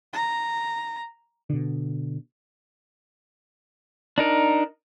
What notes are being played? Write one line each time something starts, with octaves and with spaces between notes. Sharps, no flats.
A#5
B2 D3
D4 D#4 A#4